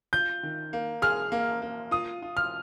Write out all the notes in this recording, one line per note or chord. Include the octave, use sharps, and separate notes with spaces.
F4 G6
D#3
A#3
G#4 F6
A#3
A#3
F4 D#6
F4
F6